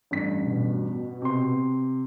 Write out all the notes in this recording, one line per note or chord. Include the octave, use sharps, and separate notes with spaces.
A1 G2 B6
B2
C3 C6